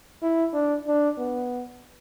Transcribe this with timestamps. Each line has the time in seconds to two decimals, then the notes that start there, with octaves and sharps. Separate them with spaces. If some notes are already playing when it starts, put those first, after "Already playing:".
0.22 E4
0.53 D4
0.87 D4
1.18 B3